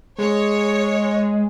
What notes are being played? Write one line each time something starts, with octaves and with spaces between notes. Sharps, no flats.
G#3 C#5